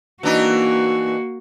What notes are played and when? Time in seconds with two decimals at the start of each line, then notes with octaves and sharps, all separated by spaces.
0.23 E3 A#3 D4 D#4 F#4